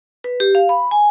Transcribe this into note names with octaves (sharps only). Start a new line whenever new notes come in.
B4
G4
F5
B5
G#5